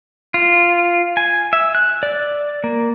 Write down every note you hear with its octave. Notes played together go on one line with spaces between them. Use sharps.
F4
G#5
E5
F#6
D5
A#3